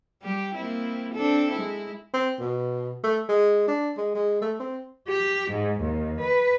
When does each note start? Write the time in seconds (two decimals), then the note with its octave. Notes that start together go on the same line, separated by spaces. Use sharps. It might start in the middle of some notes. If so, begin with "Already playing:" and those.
0.22 G3 G4
0.55 A#3 C4 E4
1.14 C4 D4 A4
1.51 G#3 E4
2.13 C4
2.40 B2
3.03 A3
3.29 G#3
3.68 D4
3.97 G#3
4.15 G#3
4.42 A3
4.60 C4
5.09 G4
5.51 G#2
5.81 D#2
6.20 B4